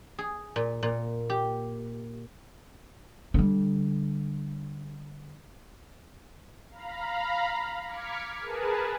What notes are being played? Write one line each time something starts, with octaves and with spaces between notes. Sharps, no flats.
G#4
A#2
A#2
G4
D3 G3
F5 A#5 B5
D6 F6 G#6 B6 C#7
G#4 A#4 B4 A5